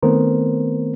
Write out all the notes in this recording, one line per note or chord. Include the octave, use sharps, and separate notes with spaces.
D#3 A3 B3 C4 A#4 C5